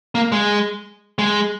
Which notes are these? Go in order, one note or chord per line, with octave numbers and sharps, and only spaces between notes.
A#3
G#3
G#3